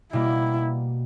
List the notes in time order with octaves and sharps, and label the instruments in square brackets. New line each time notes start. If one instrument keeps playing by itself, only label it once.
[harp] B2 G3 A#3 [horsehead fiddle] E4